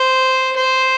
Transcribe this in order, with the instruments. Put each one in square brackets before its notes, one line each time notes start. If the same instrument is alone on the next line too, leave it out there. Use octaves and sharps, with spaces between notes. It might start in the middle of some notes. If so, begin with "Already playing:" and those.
Already playing: [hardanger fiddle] C5
C5